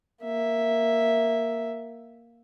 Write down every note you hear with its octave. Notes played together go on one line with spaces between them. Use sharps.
A#3 E5